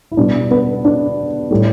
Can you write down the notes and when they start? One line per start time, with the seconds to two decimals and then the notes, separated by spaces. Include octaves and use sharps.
0.11 E4
0.17 B2 G3 D4
0.51 B3
0.85 D4
1.50 A2 G3